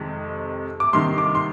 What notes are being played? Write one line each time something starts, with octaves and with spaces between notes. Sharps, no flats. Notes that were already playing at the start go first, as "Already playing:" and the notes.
Already playing: F2 C3 D#3 G#3
D6
C3 D#3 G3 C6
D6
C6